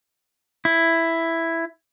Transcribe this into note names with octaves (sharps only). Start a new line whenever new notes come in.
E4